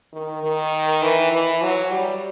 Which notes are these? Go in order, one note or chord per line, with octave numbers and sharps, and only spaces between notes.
D#3
D#3
E3
E3
F#3
G3